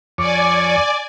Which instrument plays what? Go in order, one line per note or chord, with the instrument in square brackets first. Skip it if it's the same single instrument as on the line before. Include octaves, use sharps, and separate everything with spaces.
[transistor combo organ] F2 C#5 [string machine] D5 G#5 [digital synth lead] D6